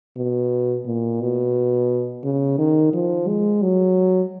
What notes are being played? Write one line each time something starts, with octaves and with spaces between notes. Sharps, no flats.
B2
A#2
B2
C#3
D#3
F3
G#3
F#3